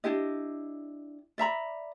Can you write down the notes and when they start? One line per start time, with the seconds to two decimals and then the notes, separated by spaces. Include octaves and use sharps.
0.04 D4 E4 G4 D#5
1.38 D5 E5 A#5 B5